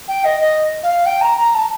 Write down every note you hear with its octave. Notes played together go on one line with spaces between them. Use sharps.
G5
D#5
D#5
F5
G5
A#5
A#5
A5